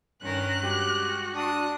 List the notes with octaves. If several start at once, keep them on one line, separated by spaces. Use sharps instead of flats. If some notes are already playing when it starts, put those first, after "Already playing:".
G2 D#3 C#4 A#4 F#6
G#3 F#4 G4
D4 D#6 F#6